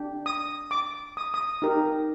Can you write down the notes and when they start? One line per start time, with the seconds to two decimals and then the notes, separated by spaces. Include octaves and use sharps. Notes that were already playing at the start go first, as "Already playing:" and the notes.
Already playing: D4 G4
0.26 D#6
0.71 D6
1.17 D#6
1.34 D#6
1.62 D#4 G4 A#4